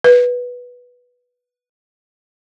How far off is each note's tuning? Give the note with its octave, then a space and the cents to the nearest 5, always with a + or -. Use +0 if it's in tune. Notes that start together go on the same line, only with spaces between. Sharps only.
B4 -10